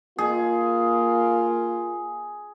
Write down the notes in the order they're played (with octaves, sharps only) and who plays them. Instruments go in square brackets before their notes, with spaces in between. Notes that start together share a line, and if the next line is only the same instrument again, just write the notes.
[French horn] A#3 [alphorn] F4 [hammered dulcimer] G#4